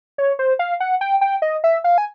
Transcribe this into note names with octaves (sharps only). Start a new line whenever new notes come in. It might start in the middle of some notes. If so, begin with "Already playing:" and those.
C#5
C5
F5
F#5
G5
G5
D#5
E5
F5
G#5